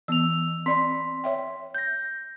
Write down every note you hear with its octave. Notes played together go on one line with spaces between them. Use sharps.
E3 B3 E6 F7
C4 D5 B5 C6 B6
C#5 E5 G5
G6 A#6